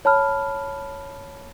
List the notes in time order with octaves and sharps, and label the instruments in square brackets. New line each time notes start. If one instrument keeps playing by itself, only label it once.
[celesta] C#5 A5 B5 F6